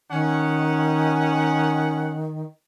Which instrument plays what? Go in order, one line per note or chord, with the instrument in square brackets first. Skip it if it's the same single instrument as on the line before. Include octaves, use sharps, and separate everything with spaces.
[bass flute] D#3 [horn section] C#4 F#5